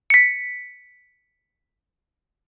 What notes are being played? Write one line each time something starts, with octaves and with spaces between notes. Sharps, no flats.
B6 C#7